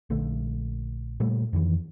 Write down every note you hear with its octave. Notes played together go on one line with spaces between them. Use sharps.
A#1 D3 A3
A#2 G3 A3
F2 D#3 E3